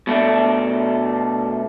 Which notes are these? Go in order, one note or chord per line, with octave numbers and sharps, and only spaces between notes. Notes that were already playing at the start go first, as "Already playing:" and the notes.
B2 A3 D4